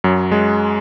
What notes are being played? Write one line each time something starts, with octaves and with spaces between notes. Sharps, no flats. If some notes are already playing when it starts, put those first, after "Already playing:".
F#2 F#3
G#3